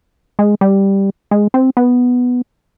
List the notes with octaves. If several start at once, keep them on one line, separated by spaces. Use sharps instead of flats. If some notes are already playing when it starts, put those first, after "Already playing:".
G#3
G3
G#3
C4
B3